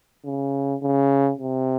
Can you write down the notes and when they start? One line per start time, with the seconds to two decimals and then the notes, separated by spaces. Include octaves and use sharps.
0.25 C#3
0.82 C#3
1.38 C3